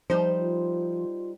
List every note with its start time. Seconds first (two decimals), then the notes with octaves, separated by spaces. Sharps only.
0.10 F3 G3 D#4 C5
0.38 F4